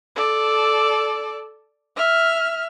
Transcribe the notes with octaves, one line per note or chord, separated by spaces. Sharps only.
A4 D5
E5 F6